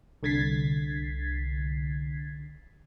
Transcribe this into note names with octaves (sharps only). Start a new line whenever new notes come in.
C2 D3 G#6 A6 B6 C7